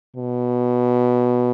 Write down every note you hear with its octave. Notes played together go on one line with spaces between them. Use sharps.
B2